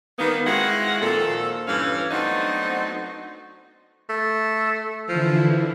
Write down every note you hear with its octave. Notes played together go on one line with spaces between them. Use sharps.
D#3 G3 A#3 B3
G#3 C4 E4 F#4 F5 F#5
A#2 D#3 F3 A4
G2 E3 C#4 F5
F#3 A3 B3 C4 D4 D#4
A3
D3 E3 F3 E4